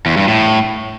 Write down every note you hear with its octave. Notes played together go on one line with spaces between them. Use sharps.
E2
G2
A2